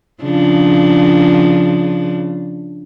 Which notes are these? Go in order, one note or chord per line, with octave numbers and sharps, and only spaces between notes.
C#3 F3 D4